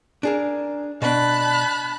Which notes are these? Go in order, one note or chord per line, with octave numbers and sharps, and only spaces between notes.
D4 G#4 A#4
B2 D4 A5 B5 F#6